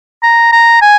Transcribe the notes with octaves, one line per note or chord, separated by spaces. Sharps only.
A#5
A#5
G#5